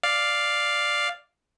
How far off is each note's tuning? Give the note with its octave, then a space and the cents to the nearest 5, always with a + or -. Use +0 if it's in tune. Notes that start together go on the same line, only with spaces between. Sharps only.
D5 +0 F5 +0